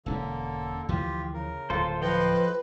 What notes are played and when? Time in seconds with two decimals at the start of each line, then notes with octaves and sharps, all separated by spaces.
0.06 E1 D3 A#3 C4 C#4 A4
0.89 D2 E3 F3 F4 G4
1.33 C#3 A#4
1.70 D1 F4 A4 C5
2.01 F3 A4 B4 C5 D#5 F5 G5